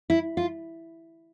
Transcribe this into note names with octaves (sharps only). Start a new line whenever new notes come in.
E4
F4